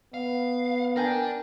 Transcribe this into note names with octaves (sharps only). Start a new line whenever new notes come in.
B3 F5
D4 A#4 G5 G#5